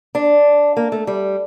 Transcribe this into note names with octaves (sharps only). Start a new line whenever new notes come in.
D4
A#3
A3
G3